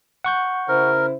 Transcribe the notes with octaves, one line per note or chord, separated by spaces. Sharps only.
F#5 C#6 G6
C#3 E4 A#4 C5